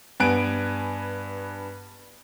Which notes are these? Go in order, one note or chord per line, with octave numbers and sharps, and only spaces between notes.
G2 B3 G#5 F#6 D7